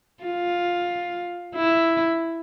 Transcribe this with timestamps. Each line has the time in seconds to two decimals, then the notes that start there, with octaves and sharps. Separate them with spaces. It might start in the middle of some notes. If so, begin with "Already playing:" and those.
0.23 F4
1.55 E4